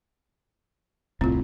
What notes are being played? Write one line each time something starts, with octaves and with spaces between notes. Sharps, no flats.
D#1 C2 A2 C4 F4